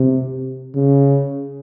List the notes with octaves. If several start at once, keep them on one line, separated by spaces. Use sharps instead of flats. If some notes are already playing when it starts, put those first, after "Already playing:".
Already playing: C3
C#3